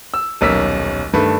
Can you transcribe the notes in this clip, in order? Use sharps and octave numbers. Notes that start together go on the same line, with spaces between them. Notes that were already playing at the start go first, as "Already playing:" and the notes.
E6
D#1 B1 C#4 A#4 E6 B6
G2 D#3 A3 D4 A4 B4